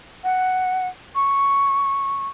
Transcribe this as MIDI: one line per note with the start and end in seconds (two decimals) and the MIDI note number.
0.24 0.88 78
1.15 2.28 85